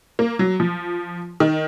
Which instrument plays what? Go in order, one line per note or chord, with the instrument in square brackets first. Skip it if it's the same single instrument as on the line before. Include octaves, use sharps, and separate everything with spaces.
[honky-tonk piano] A#3
F#3
F3
D#3